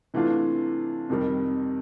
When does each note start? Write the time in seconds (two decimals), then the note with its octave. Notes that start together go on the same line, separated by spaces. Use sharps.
0.14 C3 E3 A3 D4 F4
1.09 F2 C3 D#3 G3